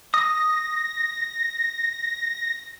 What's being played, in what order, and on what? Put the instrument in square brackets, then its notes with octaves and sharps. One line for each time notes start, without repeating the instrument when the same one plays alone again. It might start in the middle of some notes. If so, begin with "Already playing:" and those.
[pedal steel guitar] D#6 [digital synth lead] A#6